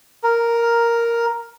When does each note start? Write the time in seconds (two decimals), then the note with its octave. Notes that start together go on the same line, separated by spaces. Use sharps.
0.24 A#4